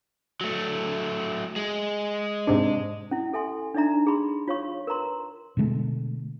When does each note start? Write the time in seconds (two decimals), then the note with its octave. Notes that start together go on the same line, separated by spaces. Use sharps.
0.41 F#3 A3
1.56 G#3
2.47 G#2 C3 D4
3.11 C#4 E4
3.33 G4 A4 E5 G#5 C6
3.74 D4 D#4 D5 E5 A#5
4.07 G#4 B5 C6
4.48 F4 C#5 F5 C#6
4.87 A#4 B4 A#5 C6
5.57 B2 D3 G#3 A3